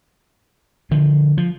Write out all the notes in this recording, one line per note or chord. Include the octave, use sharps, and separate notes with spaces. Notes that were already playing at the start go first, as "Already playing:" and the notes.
D3 F3
F3